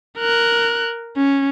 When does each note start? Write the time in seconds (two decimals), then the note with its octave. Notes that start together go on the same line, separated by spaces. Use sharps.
0.19 A#4 F#6
1.17 C#4